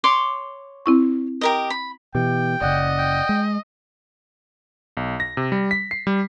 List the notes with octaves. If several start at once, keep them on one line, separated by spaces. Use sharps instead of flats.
C#5 C6 D6
C4 E4 C#6
G4 A#4 D#5
B5
B2 E3 G4 G5
F#1 C#3 D5 D#5 F#5 F#6
G5
G#3
B1
A#6
C3
G3
B6
C7
G3